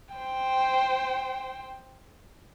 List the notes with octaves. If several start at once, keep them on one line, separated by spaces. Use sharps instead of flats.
C5 G5